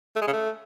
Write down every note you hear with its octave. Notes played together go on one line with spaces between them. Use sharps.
A3
G#3
C#3
A3